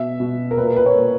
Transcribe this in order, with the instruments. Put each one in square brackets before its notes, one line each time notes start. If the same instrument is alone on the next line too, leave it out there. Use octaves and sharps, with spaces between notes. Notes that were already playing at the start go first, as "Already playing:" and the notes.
Already playing: [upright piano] B2 E5
B2
A#4
A#2 B4
A#4
B4
C#5
A#2